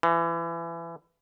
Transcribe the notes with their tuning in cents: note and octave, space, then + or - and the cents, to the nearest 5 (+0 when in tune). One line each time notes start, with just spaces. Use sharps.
E3 +25